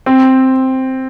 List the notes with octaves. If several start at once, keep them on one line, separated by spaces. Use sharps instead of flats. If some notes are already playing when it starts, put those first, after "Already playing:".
C4